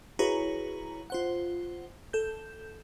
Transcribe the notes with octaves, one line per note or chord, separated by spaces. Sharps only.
E4 F#4 G#4 B4 C#5 A#5
F4 C5 F#5
A4 G6